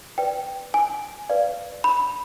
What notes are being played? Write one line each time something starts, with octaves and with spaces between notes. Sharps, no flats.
B4 D5 G5
G#5
B4 D5 F5
B5